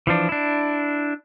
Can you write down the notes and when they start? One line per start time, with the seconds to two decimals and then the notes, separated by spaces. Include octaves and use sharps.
0.07 E3 F3 D4
0.29 D4 E4